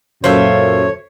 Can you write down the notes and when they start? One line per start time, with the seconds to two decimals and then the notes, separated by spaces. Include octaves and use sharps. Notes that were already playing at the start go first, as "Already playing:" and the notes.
0.24 F#2 A#2 F4 A4 C5 C#5 E5